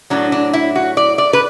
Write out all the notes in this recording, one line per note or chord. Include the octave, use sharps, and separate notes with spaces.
A2 F#3 D4
D4
E4
F#4
D5
D5
B4